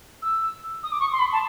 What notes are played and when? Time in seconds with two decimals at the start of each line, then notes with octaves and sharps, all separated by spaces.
0.22 E6
0.83 D#6
0.92 D6
1.00 C#6
1.12 C6
1.19 B5
1.33 A5